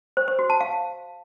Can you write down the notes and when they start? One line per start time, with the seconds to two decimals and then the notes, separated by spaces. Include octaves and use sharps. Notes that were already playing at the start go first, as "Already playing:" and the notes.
0.17 C5
0.28 C5
0.39 F#4
0.50 A5
0.60 F5